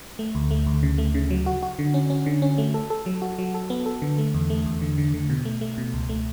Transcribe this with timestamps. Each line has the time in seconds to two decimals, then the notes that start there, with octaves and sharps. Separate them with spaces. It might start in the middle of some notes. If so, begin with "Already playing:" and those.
0.19 A3
0.35 D2
0.51 A3
0.66 D2
0.83 C#3
0.98 A3
1.15 C#3
1.30 F#3
1.46 F#4
1.63 F#4
1.79 D3
1.94 C#4
2.10 C#4
2.26 D3
2.42 C#4
2.58 A3
2.74 A4
2.90 A4
3.06 F#3
3.22 F#4
3.39 F#3
3.54 A4
3.70 B3
3.86 A4
4.02 D3
4.18 A3
4.34 E2
4.50 A3
4.66 E2
4.82 D3
4.98 D3
5.14 D3
5.30 B2
5.45 A3
5.61 A3
5.78 B2
5.94 C#2
6.09 A3